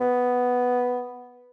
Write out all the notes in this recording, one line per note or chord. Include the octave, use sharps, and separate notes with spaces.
B3